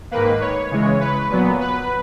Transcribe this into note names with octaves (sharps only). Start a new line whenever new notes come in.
G#2 D#3 A#3 B4
C#5
C#3 E3 G#3
B4
A#2 F#3 B3
B4